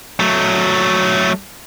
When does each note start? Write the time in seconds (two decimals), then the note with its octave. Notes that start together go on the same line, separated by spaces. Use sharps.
0.20 F#3 A3